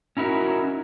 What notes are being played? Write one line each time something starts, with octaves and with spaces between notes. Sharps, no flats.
C#4 D#4 E4 F#4 A#4